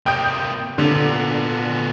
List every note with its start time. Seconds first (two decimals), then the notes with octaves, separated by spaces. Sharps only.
0.06 C3 A#3 G5 D#6 G6
0.78 A#2 D3 B3 A4